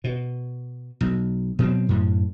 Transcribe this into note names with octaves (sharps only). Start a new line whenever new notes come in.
B2
B1
B2 F#3 G#3 C4
F#2 A2